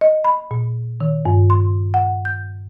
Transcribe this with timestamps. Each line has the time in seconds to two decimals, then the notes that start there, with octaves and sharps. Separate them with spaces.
0.01 D#5
0.24 B5
0.51 A#2
1.00 D#3
1.25 G2
1.50 C6
1.94 F#5
2.25 G6